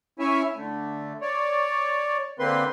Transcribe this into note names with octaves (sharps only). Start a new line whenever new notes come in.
C#4 E4 C#5 E5 G#5
D3 A3
C#5 D5
D3 A#3 C4 B4 C6